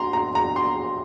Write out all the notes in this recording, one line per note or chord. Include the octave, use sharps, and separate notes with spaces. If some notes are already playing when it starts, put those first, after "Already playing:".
Already playing: A#5 C6
A#5
A#5
C6